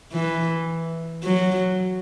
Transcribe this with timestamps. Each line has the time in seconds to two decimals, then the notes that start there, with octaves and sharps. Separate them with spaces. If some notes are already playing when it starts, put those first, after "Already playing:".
0.13 E3
1.24 F#3